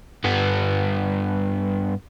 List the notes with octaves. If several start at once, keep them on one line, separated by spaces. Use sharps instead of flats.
G2 B3